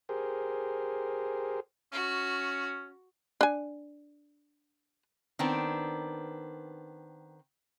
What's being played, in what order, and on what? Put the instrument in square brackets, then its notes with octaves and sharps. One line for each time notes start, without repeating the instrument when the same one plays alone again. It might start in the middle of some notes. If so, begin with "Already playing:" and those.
[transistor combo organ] G4 G#4 A#4 C5
[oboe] C#4 [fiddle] F#4
[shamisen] D4 G#5
[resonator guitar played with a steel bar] D#3 B3 C4 D4